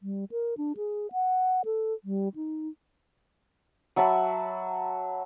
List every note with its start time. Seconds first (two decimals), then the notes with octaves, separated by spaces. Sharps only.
0.03 G3
0.31 A#4
0.58 D4
0.77 G#4
1.12 F#5
1.65 A4
2.04 G3
2.36 D#4
3.96 F#3 E5 A5 B5